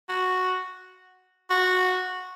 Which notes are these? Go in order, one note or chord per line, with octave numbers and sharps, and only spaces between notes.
F#4
F#4